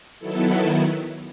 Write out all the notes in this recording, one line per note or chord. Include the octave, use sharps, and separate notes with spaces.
D#3 F#3 B3 E4 A4